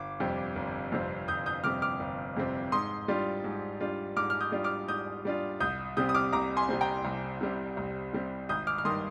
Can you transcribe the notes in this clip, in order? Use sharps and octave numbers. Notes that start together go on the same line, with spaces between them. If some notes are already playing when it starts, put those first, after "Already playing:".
Already playing: G1 D6
F2 C3 G3 C4
G1
F2 C3 G3 C4
G1 D#6 G6
D#6 G6
F2 C3 G3 C4 D6 F6
D6 F6
G1
F2 C3 G3 C4
G#2 C6 D#6
G3 D4 F4
G#2
G3 D4 F4
G#2 D6 F6
F6
D#6 G6
G3 D4 F4
D6 F6
G#2 D#6 G6
G3 D4 F4
C2 D#6 G6
C3 G3 C4 D#6 G6
D#6
D6 F6
C2 A#5 D6
G#5 C6
C3 G3 C4
G5 A#5
C2
C3 G3 C4
C2
C3 G3 C4
G#1 D#6 G6
D6 F6
F6
G2 D#3 C6 D#6